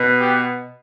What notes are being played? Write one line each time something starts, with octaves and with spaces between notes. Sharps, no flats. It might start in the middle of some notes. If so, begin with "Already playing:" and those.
Already playing: B2 B3
G4